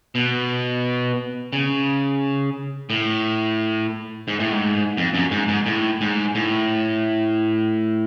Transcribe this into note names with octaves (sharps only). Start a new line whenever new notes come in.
B2
C#3
A2
G#2
A2
G#2
F2
F#2
G#2
G#2
A2
G#2
A2